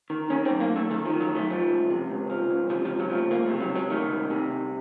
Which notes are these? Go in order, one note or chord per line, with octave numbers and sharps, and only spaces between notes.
D#3
D#3 C#4
C4
F#2
A#3
F#2
A3
D#3 A3
F3
D#3
F#3
F#2 A3
F3
C#2
C3
C#2
F3
C#2
C3 F3
F3
C#2
F#3
F3 A3
C#2 A#3
A3
C3
F#3
C#2
F#3
D#3 A3
C2
C3
C2